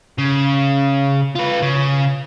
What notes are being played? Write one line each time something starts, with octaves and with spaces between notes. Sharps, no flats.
C#3
F4 B4
C#3